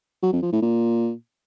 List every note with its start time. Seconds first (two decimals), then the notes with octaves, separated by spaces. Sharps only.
0.23 F#3
0.33 F2
0.43 F3
0.52 A2
0.62 A#2